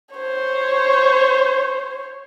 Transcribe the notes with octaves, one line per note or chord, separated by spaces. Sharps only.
C5 C#5